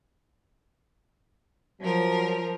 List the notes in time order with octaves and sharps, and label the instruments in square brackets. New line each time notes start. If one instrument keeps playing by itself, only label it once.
[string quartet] F3 A#4 [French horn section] F#3